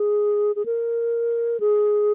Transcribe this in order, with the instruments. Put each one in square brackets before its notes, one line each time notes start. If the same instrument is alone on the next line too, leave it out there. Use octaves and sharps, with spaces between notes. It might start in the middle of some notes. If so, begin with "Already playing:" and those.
Already playing: [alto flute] G#4
G#4
A#4
G#4